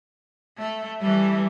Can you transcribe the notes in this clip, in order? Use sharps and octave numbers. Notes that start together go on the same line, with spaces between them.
A3
E3 G3 A3